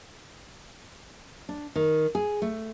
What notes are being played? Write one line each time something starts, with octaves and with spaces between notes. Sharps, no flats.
D4
D#3
G#4
A3